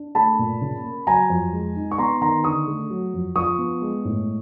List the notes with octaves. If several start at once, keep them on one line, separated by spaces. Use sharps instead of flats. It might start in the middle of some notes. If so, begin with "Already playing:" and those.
Already playing: D4
A3 A5 B5
A#2
C#3
A#3
F#3 G#5 A#5
F2
G#3
D#4
C#6
B3 A#5 C6
D#3 A#5 C6
D3 C#6 D#6
A3
F#3
F2
F3 C#6 D#6
B3
G#3
A2